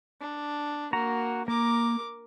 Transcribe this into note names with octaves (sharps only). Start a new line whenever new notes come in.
D4
A#3 F#4 A#5
A#3 A#4 D6